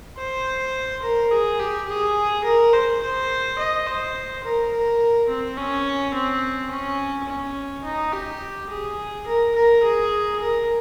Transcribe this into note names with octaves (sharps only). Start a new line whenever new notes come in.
C5
A#4
G#4
G4
G#4
A#4
C5
C5
D#5
C5
A#4
A#4
C4
C#4
C4
C#4
C#4
D#4
G4
G#4
A#4
A#4
G#4
A#4